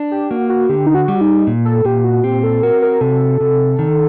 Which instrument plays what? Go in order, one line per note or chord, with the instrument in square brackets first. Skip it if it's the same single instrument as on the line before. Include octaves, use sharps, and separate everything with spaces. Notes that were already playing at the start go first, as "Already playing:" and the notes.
Already playing: [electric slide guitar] D4
[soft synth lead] G4
[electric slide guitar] A#3 [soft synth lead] F#4
[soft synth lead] F#4
[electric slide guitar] D3 [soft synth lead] G4
[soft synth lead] D#4
F#4
[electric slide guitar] G3
[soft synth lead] D#4
[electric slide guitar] A#2
[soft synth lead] A4
[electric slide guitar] A#2 [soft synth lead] G4
[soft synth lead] F#4
[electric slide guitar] C4 [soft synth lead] G4
[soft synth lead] A4
[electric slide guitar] F#4 [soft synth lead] A#4
[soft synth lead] A#4
[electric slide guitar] C3 [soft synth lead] A4
[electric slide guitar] C3
D#3